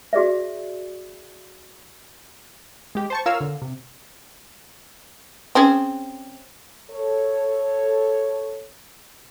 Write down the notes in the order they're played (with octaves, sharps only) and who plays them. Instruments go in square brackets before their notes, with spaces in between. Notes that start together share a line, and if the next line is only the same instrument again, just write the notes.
[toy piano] F#4 G#4 D5 E5
[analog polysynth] G#3 G4
C5 A5 C#6
F4 A#4 C#5 F5 E6
D3
C3
[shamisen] C4 C#4 G#4
[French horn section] A4 C#5